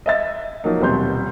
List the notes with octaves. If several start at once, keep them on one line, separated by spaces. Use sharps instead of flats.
D#5 E5 A6
F3 F#3 A#3 D#4
D#1 C2 B2 B4 C6 G6